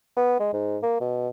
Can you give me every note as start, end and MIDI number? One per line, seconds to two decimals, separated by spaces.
0.17 0.38 59
0.40 0.52 56
0.53 0.78 44
0.83 0.97 58
1.00 1.28 47